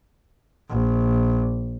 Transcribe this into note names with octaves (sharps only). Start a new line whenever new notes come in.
A#1